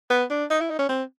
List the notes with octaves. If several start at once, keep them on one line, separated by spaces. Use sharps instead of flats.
B3
D4
D#4
E4
D#4
C#4
C4